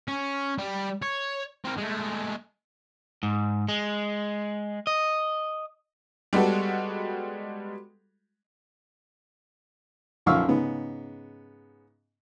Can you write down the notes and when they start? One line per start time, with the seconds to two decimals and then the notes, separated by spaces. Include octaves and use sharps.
0.08 C#4
0.59 G3
1.02 C#5
1.64 C4 A#4
1.78 G#3 A3
3.23 G#2
3.69 G#3
4.87 D#5
6.33 G3 G#3 B3 F#4 A4
10.26 B1 F#2 F3 F5 C#6 E6
10.47 G#2 C#3 B3